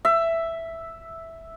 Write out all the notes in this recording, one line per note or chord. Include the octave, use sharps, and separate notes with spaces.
E5